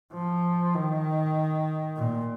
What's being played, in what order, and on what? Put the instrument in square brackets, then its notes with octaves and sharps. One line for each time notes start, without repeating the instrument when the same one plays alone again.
[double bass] F3
D#3
A#2